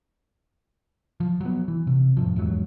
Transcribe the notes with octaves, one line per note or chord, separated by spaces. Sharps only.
F3
F#3 B3
E3
C3
F2 A2 F3
E2 G#2 F#3